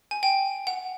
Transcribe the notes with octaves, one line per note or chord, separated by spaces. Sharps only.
G#5
G5
F#5